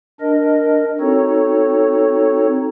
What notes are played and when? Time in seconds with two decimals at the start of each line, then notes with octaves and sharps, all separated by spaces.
0.20 D4 A#4 D#5
1.00 C4 D#4 F#4 A4 C#5